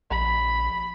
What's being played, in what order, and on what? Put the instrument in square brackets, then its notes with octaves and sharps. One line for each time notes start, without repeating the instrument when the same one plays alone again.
[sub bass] A#1 [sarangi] B5